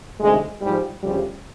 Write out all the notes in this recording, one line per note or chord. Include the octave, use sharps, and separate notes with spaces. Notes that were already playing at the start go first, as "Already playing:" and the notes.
D2 C3 D#3 G#3
G#2 F3 G3
D2 C#3 F3 G3